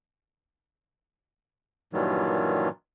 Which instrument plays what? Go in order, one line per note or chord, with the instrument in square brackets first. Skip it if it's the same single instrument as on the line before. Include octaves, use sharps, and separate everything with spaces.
[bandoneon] G2 A#2 D#3 E3 F#3 G3